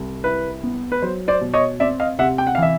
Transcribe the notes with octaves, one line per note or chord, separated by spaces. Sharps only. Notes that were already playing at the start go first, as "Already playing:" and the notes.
Already playing: C2
E4 B4
B3
B4
F#3 C5
C5 D5
B2
C#5 D#5
C4 D5 E5
D#5 F5
C3 E5 F#5
G5
F#5
E3 F5
E5